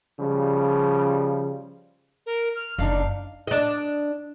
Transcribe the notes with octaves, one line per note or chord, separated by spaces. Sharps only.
C#3 F3 G3
A#4
F6
F#1 D3 D4 D#4 F5
D4 D#5